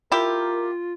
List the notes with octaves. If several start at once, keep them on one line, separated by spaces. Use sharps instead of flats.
E4 F4 G4 A#4